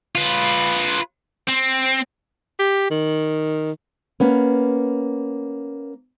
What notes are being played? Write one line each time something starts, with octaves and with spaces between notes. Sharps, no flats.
F4 B4
C4
G4
D#3
A#3 B3 C#4